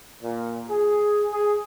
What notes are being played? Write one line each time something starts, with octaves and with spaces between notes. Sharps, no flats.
A#2
G#4
G#4